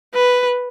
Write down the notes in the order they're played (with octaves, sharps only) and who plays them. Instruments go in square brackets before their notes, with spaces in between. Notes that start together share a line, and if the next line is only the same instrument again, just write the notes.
[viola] B4